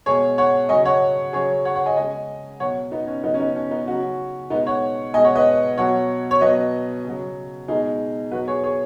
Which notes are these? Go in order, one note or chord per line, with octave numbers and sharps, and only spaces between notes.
B2 G#3 G#4 C#5
C#5 F#5
C#3 F#3 D#5 G#5
C#5 F#5
C#3 F#3 G#4 C#5
C#5 F#5
C#5 F#5
D#5 G#5
C#3 G#3 D#5 G#5
B2 F#3 C#5 F#5
B3 D#4
C#4
C#3 F#3 B3 D#4
C#4
B3 D#4
C#4
B3 D#4
C#3 F#3 C#4 F#4
B2 G#3 B3 D#4
C#5 F#5
B2 G#3 D#5 G#5
C#5 F#5
B4 D#5
B2 F#3 C#5 F#5
C#5
B2 F#3 B4 D#5
C#3 F#3
B2 G#3 D#4 G#4
B2 F#3 F#4 B4
G#4 C#5
G#4 C#5